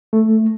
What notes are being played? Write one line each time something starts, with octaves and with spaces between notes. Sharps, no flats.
A3